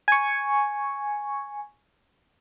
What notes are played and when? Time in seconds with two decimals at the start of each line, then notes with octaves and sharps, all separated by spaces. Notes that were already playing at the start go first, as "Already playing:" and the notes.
0.08 G#5 C#6